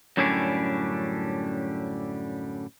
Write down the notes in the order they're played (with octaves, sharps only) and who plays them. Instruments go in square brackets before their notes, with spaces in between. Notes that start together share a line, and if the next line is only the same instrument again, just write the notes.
[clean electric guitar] F#2 A2 D3 G3 C#4 D4